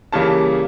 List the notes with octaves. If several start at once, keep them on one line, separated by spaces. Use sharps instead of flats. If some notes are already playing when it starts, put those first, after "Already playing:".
C#3 E3 G3 A#3 A5